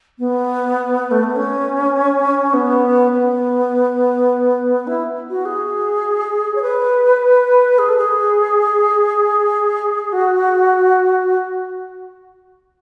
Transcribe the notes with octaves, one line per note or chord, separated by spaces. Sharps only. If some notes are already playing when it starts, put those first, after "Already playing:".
B3
A3
B3
C#4
B3
B3
E4
F#4
G#4
C#5
B4
G#4
A4
G#4
F#4